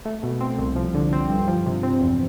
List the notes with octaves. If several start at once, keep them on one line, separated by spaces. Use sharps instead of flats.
A3
B2
C4
C2
F3
D3
C4
G2
F3
C3
C4
E2